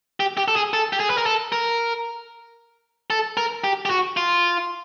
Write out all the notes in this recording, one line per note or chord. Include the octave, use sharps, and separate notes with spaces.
G4
G4
A4
G#4
A4
G4
G#4
B4
A#4
A4
A#4
A4
A#4
G4
G4
F#4
F4